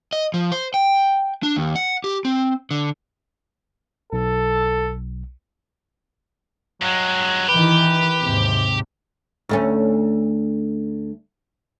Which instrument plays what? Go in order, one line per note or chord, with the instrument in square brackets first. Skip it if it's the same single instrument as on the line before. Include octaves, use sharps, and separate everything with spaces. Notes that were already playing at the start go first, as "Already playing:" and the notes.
[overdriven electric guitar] D#5
F3
C5
G5
D4
D#2
F#5
G4
C4
D3
[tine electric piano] B1 [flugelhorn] A4
[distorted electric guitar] G2 G#3 [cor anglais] F#3
[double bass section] D#3 E3 [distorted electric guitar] G4 [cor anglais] B4
[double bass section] D#2 G#2 C3
[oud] D2 A3 C#4